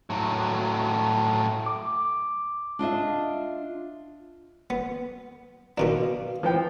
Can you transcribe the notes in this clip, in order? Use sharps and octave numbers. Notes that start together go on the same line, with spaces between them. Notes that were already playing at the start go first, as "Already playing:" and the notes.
A2 F#3
D6
D4 F4 D#5 E5
B3
B2 D#3 D4 B4 F5
E3 F3 B4 G5